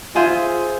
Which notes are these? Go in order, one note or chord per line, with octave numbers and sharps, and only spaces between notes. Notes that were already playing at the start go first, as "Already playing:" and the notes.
F4 G#4 C5 E5 G#5